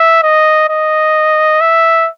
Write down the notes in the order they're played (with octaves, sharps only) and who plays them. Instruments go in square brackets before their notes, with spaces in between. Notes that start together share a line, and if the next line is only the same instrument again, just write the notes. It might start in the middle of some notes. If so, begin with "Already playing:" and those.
Already playing: [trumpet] E5
D#5
D#5
E5